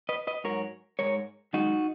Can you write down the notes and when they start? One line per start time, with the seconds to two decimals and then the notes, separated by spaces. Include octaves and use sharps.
0.09 B4 D#5
0.27 B4 D#5
0.44 G#2 F#3 A#4 C#5
0.99 G#2 E3 G#3 A#4 C#5
1.53 F#2 D#3 G#3 D#4 F#4